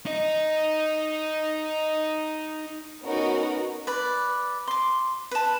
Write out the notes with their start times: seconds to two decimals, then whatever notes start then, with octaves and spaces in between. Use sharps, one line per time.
0.06 D#4 D#5
3.04 B3 C#4 D#4 F#4 A#4
3.87 B4 D5 B5
4.68 C6 D6
5.31 B4 A5